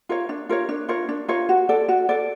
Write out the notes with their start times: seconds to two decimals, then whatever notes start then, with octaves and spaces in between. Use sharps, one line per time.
0.09 F4 A#4 C#5
0.29 D4
0.49 F4 A#4 C#5
0.69 D4
0.88 F4 A#4 C#5
1.09 D4
1.28 F4 A#4 C#5
1.49 F#4
1.69 A4 D5
1.88 F#4
2.09 A4 D5